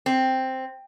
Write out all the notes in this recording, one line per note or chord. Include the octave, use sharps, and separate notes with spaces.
C4